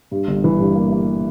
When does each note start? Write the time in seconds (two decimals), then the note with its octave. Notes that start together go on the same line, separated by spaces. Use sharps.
0.11 G2
0.28 G1
0.44 E3
0.60 G2
0.76 A#3
0.92 A#3